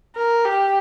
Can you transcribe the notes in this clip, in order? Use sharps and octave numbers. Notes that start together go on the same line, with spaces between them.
A#4
G4